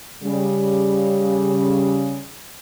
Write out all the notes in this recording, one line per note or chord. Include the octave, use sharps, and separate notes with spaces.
C#3 G3